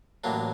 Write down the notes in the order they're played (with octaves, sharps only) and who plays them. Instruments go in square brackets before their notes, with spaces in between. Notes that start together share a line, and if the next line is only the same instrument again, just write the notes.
[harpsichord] A1 A2 F#3 A#3 D4